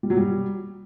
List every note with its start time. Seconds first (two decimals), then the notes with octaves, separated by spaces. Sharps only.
0.03 G3
0.10 F#3
0.17 G3